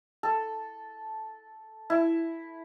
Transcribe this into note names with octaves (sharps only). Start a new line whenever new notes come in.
A4
E4